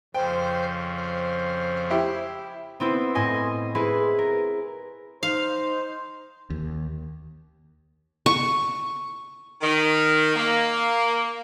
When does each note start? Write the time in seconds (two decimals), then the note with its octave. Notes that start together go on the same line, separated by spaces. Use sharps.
0.14 F2 C#3 C5 G5
0.96 C5
1.90 E4 G4
2.80 B3 C4 E4 C5
3.15 A2 C5 D#5 G#5 A#6
3.75 E4 G#4 B4 C5
4.19 A#4
5.23 D#4 C5 F5
6.50 D#2
8.26 C#6
9.61 D#3
10.36 A#3